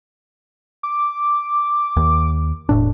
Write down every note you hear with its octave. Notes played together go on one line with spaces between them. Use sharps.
D6
D#2
E1 A2 D4